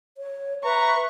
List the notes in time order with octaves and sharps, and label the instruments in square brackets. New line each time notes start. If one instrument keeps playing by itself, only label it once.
[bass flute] C#5
[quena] B4 [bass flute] E5 [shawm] A#5 [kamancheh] C#6